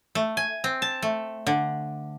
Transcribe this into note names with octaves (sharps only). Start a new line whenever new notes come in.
A3
G#5
C4
A5
A3
D3